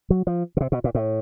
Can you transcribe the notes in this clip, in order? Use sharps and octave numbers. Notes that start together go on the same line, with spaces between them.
F#3
F3
C#3
C3
B2
A#2
A2